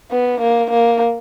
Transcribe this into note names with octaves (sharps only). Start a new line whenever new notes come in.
B3
A#3
A#3